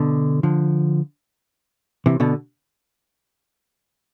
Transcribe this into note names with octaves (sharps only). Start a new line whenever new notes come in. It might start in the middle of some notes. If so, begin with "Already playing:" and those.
Already playing: B2 D3
D3 F3
C3 E3
B2 D3